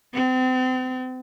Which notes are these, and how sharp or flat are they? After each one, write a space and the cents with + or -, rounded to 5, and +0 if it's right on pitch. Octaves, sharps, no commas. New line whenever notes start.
C4 -35